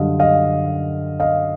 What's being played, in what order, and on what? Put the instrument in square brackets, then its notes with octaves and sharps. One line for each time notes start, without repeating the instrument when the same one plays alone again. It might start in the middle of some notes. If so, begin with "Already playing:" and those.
Already playing: [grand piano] F#2 D3 G3 D#5 F5
D#5 F5
D#5 F5